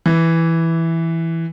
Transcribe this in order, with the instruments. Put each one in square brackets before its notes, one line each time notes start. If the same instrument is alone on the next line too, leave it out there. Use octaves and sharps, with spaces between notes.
[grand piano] E3